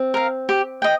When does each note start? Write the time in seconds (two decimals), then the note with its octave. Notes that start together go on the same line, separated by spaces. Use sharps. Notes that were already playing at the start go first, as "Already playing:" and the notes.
Already playing: C4
0.14 A#4 F5
0.49 G4
0.82 D#5 G5